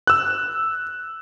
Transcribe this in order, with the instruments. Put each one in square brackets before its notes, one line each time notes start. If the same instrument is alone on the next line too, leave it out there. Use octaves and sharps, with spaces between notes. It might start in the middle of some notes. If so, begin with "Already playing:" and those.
[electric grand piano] E6 F#6